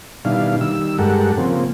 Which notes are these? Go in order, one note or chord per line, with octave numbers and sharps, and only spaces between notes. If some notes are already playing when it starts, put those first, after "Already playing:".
B2 D#3 G3 D4 E4 F5
D#3 G3 E6
G2 G#3 G4 A4 A#4 F#5
C#3 F3 A#3 C4